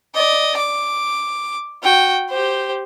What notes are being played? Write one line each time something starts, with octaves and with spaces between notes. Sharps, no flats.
D5 D#5
D6
F#4 G5
G4 C5